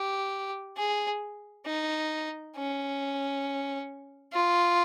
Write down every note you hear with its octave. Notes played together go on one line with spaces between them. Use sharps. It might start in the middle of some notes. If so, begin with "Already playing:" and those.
Already playing: G4
G#4
D#4
C#4
F4